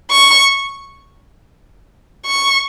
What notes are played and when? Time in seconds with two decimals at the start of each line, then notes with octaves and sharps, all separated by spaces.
0.11 C#6
2.26 C#6